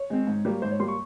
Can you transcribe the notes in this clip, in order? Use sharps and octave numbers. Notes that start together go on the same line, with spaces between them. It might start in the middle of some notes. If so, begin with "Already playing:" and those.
Already playing: C#5
G#3 C4
G#2
G3 A#3
G#2 C5
C#5
G3 A#3 C6
C#6